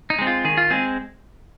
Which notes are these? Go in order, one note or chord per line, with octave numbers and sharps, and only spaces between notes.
D#4
G#3 C4
F4
D#3 G#4
F4
G#3 C4 G#4